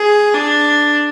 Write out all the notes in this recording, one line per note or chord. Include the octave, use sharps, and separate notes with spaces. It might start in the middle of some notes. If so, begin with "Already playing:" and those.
Already playing: G#4
D4